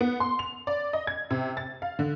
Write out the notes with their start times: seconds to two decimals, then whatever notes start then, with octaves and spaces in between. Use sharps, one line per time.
0.01 B3
0.20 C6
0.39 F7
0.67 D5
0.93 D#5
1.07 G#6
1.30 C3
1.57 A6
1.82 F5
1.99 D3